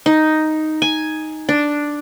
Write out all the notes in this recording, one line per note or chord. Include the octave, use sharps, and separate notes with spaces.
D#4
G#5
D4